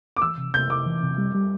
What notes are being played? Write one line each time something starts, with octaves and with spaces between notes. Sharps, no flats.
D6
E3 E6
C3
C3 G6
C3 D6
E3
C3
G3
G3